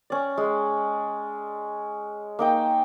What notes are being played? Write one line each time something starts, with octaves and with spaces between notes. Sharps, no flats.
C#4 D5
G#3
A#3 D#4 G5